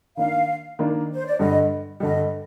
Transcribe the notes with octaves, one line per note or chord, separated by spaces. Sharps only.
D#3 A#3 D4 F5
D#3 A#3 D4
C5
D5
G2 D3 G3 D#5
G2 D3 G3 D#5